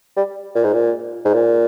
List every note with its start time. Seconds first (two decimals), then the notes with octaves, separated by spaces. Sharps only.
0.17 G3
0.55 A#2
0.64 G#2
0.73 A#2
1.25 G#2
1.34 A#2